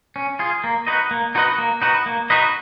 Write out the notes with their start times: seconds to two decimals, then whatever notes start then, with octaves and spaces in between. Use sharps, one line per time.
0.16 C#4
0.39 F4 G#4
0.64 A#3
0.87 D#4 F#4 B4 D#5
1.11 A#3
1.35 D#4 F#4 B4 D#5
1.58 A#3
1.82 D#4 F#4 B4 D#5
2.06 A#3
2.30 D#4 F#4 B4 D#5